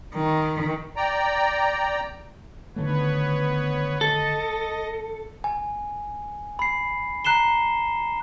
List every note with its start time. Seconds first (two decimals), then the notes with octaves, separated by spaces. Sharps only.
0.15 D#3
0.96 D5 G5 A#5
2.76 D3 D#3 A3 B3 B4 C#5
4.01 A4 D#5
5.44 G#5
6.59 B5 C7
7.25 A#5 F#6 C7 E7 G7